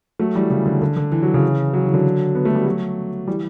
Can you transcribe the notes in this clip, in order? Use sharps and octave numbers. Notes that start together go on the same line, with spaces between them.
F#3 A3
E3 G3
C#3 E3
D3
D3
D3
E3
F#3
C#3 E3
F#3
E3
D3 F#3
B3
A3
G3
F#3 A3
E3 G3